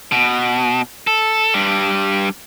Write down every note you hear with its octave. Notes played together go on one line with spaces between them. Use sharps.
B2
A4
G2 G3